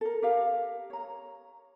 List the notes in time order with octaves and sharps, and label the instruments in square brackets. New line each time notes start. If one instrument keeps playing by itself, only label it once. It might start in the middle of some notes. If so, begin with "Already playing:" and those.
[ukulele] A4 A#4
G4 A#4 F5
C#5 A#5